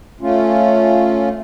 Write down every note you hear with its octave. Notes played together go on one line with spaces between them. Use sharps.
A3 C#4 F4